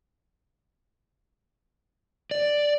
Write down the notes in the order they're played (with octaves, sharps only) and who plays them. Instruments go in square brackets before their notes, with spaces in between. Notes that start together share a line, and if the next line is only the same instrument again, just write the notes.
[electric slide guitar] D5